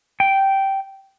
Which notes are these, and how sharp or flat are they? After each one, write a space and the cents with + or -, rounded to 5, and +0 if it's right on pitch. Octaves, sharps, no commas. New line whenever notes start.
G5 -10